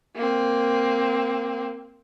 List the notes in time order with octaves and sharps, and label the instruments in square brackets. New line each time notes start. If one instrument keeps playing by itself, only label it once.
[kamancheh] A#3 C4